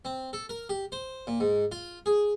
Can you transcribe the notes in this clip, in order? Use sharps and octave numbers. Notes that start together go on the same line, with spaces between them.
C4
A4
A#4
G4
C5
A#2
G#2
F4
G#4